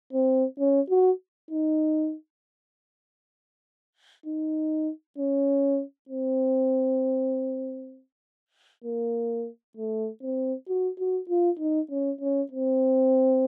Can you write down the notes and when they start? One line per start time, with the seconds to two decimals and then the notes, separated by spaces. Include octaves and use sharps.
0.13 C4
0.59 C#4
0.90 F#4
1.51 D#4
4.26 D#4
5.18 C#4
6.09 C4
8.84 A#3
9.77 A3
10.22 C4
10.68 F#4
10.99 F#4
11.29 F4
11.59 D#4
11.90 C#4
12.20 C#4
12.51 C4